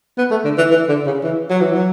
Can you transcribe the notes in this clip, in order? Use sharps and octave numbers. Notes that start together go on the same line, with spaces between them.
B3
A3
D3
E3
E3
D3
C#3
E3
F#3
E3
F#3